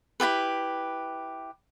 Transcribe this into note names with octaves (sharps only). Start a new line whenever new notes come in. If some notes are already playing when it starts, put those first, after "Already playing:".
E4 F4 G4 B4